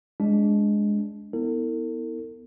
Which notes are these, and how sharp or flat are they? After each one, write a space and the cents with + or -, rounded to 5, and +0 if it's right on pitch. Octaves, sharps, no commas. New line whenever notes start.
G#3 +0 D4 -20
B3 -5 E4 -35 A4 +45